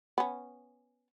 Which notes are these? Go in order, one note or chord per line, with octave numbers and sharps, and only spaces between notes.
B3 C#4